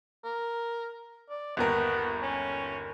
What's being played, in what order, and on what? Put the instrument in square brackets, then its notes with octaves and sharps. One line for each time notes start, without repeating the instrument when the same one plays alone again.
[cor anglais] A#4
D5
[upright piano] G1 D#2 A#4 [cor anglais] B3
[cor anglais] C#4